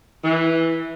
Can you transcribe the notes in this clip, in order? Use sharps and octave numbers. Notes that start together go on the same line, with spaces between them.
E3